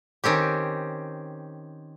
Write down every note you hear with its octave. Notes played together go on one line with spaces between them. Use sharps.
D#3 C4 C#4 G4